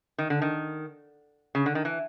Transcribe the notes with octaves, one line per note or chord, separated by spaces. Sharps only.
D#3
D3
D#3
C#3
D3
D#3
E3